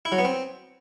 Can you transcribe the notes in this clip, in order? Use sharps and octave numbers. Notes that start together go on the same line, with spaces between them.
E4
F#3
B3
C4